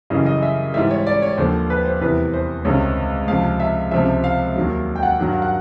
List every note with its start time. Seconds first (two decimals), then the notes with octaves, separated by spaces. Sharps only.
0.10 F#2 C#3 E3 G3 D#5
0.26 D#5
0.42 E5
0.74 G#2 E3 G3 E5
0.91 C#5
1.07 D5
1.22 C#5
1.37 D#2 D3 F3 C5
1.70 B4
1.86 C5
2.01 E2 C3 E3 G3 B4
2.34 C5
2.64 C#2 C3 D#3 G3 C#5
3.28 C#2 C3 F3 F5
3.60 E5
3.91 C#2 C3 F3 E5
4.24 F5
4.56 D#2 D#3 F#3
4.96 G5
5.03 F#5
5.19 G2 D#3 F#3
5.33 F5
5.42 F#5